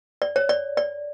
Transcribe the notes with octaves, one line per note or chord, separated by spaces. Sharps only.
D5
C#5
D5
D5